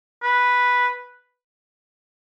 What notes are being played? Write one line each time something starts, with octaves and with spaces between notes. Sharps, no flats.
B4